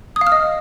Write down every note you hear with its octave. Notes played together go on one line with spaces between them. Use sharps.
D#6
F5
F6
D#5